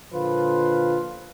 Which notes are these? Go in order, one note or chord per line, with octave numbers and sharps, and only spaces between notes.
A#2 D3 F3 F4 B4